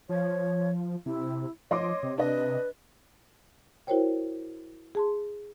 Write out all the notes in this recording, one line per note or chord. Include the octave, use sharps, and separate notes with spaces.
F3 C#5
C3 E4
F3 C#5 D#5 C6 D6
C3
D4 B4 D#5
E4 F#4 A#4 C5 C#5 G5
G#4 A5 C6